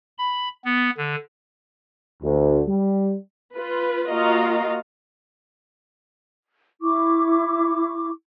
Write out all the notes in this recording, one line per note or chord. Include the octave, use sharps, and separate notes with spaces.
B5
B3
D3
D2
G3
F4 B4
A#3 F4 F#4 D#5 F5 A#5
E4 C#6 D6